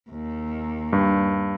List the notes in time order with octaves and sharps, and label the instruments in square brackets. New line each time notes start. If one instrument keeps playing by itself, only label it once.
[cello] D#2
[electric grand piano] G2